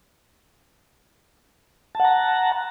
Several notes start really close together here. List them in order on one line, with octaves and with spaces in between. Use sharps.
A5 F#5 A#5